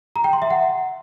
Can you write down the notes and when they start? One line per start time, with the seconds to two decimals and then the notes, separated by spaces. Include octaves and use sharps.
0.16 A#5
0.24 G5
0.33 C6
0.42 E5
0.50 F#5